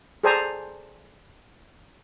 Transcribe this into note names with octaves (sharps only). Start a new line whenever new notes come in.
G#4 A4 C5 D5 G#5 A#5